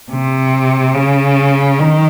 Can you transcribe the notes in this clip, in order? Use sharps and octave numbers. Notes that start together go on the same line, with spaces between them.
C3
C#3
D#3